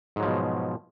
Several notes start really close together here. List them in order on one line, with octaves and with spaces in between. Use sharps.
G#2 F#3 F3 B2